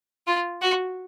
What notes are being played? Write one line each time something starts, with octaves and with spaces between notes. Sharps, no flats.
F4
F#4